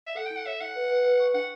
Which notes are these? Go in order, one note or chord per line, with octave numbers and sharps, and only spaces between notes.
E5
A4 F#5
G5
E4
F#5
C#5 E5
E4 F#5
B4
B4
B4
C#6
D4 F#5